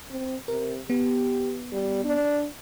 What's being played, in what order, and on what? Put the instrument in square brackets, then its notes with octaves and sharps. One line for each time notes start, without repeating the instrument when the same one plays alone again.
[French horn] C4
[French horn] C3 [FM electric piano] A#4
[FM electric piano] B3 [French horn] G4
[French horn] G3
D4